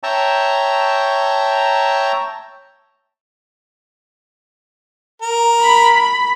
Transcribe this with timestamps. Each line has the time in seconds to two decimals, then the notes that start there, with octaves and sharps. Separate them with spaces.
0.03 C#5 E5 G5 A5 A#5 C#6
5.22 A#4
5.63 B5